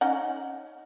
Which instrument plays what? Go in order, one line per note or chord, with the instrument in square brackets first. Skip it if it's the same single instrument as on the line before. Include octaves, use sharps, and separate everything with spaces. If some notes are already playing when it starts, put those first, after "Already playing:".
[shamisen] C#4 D#4 F#5